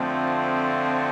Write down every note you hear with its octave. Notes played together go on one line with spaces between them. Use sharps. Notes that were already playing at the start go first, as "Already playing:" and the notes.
Already playing: F2 D3 F3 A3 C4